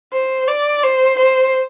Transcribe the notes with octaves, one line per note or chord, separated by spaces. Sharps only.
C5
D5
C5
C5